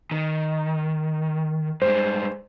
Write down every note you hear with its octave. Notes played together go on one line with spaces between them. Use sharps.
D#3
G2 G#3 C5